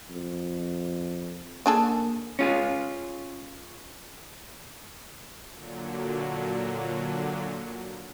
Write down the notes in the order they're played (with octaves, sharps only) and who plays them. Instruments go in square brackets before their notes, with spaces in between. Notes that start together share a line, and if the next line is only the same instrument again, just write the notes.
[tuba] F2
[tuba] A#3 [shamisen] D4 G#4 A4
[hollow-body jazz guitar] C#4 F4 G#4
[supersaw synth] A#2 D3 F#3